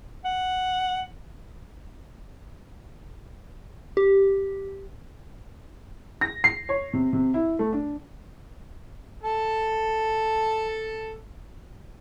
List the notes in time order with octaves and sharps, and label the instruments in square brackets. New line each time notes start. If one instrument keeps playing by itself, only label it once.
[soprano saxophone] F#5
[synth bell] G4
[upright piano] A#6
C7
C#5
C3
C3
E4
A3
D4
[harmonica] A4 A5